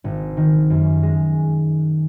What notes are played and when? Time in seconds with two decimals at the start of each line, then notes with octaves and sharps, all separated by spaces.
0.04 G#1
0.37 D#3
0.70 F#2
1.03 G#3